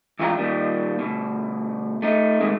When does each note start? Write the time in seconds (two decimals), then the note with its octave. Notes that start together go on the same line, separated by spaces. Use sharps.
0.19 G#2 E3 D4 F4 G5 A#5
0.38 D#2 A#2 D#3 G3
0.99 D2 B2
2.02 A3 D#4
2.40 C3 D#3 G#3 A3